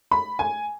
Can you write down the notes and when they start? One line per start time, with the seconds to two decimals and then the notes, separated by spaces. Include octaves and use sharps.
0.11 B5
0.39 G#5